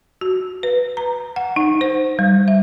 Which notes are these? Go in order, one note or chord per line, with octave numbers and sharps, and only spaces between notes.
F#4
B4
A#5
F#5
D#4
C5
G3
E5